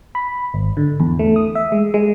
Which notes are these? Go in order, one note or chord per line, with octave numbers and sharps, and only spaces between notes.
B5
G#1
D3
E2
A3
D#6
E5
G#3
G#3